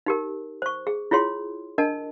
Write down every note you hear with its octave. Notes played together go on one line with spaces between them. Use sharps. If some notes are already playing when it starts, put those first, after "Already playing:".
D#4 G4 A#4
C5 C#6
G#4
E4 F4 G#4 C#5 C6
D4 A#4 D#5 A5